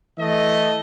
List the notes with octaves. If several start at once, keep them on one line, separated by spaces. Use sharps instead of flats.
E3 A3 D#5